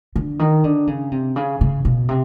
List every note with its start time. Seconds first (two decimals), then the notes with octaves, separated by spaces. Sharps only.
0.16 D3
0.39 D#3
0.64 D3
0.87 C#3
1.12 C3
1.36 C#3
1.61 C#3
1.85 B2
2.09 C3